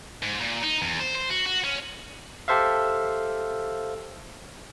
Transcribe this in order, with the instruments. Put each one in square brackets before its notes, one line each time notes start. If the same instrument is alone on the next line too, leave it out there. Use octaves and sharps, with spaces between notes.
[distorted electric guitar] G#2
A#2
D#4
E2
C5
C5
F#4
F#4
C#4
[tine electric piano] G4 A4 C5 E5 F5